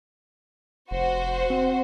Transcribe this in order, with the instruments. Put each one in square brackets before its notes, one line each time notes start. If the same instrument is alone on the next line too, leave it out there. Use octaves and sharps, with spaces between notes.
[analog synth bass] F1 [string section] F#4 C5
[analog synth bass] C4